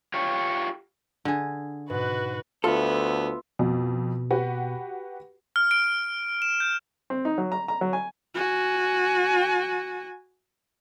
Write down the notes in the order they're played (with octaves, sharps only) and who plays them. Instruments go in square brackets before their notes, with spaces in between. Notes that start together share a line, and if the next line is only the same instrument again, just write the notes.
[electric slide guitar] F4 G4 C#5
[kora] D3 G#4
[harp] G#2 B2 [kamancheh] F#4 B4
[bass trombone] D2 [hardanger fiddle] B3 [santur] F4 E5 [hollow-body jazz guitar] A4
[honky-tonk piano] F2 [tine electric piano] B2
[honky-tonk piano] F#4 G4 B4
[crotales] F6
D7
E7
G6
[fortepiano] C4
D#4
F#3
A#5
A#5
F#3
G#5
[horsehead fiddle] F#4 G#5